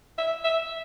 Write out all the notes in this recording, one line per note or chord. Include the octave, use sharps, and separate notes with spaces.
E5
E5